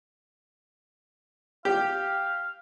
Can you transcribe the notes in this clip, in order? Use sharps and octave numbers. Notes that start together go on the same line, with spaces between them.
G4 F5